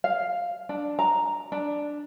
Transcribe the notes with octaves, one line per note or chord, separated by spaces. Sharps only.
F5
D4
A#5
D4